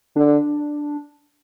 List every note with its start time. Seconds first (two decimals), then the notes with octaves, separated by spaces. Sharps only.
0.16 D3 D4